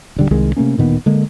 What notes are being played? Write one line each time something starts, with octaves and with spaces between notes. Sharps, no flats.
D#1 D3 G3
C2 D#3 G#3
C3 A3 A#3 C#4
D1 A#2 D#3 B3
D3 G#3 A#3